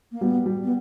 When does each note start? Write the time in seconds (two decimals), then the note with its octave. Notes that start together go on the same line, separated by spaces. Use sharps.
0.12 A#3
0.21 G3 B3
0.46 G3
0.64 B3